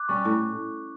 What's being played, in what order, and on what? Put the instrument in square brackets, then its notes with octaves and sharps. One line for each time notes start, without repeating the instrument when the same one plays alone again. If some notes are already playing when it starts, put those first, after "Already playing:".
Already playing: [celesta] D6 F#6
[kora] G3 C#4 G4 [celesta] C#6
[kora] A2